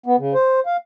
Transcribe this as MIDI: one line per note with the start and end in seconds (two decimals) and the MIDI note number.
0.06 0.16 59
0.18 0.34 49
0.34 0.60 72
0.66 0.77 77